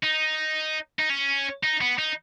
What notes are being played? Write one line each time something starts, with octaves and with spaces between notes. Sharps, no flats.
D#4
D#4
C#4
D#4
B3
D#4